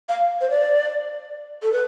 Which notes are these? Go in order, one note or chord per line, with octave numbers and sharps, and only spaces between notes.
F5
C5
D5
A4
B4